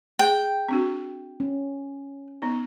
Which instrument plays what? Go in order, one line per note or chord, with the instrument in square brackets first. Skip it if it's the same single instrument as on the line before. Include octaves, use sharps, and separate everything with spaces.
[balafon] G#4 [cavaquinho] G5
[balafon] C4 D4 F#4
[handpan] C#4
[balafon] B3 D#4